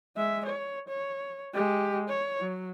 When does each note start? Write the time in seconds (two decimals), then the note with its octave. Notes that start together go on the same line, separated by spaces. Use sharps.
0.16 G#3 E5
0.46 C#5
0.88 C#5
1.53 G#3 G4
2.09 C#5
2.41 F#3